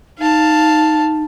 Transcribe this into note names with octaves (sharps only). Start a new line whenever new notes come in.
D#4 F5 A5